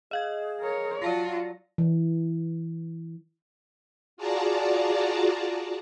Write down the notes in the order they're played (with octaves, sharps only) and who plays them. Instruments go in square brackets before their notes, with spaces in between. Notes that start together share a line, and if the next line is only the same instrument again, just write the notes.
[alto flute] G#4 [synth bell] D#5 F5 G#6
[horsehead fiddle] A#4 C#5
[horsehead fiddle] F#3 [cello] F4 F#4 [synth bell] D5 A5 A#6
[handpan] E3
[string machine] F4 F#4 G#4 D5 A5 A#5